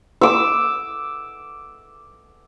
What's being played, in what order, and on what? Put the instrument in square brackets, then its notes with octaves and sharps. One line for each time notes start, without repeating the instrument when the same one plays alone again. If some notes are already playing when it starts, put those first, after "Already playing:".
[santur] D6 E6